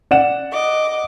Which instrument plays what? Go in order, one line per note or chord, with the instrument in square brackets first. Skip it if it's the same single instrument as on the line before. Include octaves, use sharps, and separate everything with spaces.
[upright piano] D5 F#5 E7
[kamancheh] D#5 D6